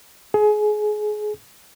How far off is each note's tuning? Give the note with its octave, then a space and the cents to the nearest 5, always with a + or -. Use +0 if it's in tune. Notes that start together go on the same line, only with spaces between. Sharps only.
G#4 +25